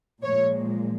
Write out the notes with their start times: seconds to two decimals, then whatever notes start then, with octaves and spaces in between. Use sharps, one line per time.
0.23 A#2 F3 G#3 C#5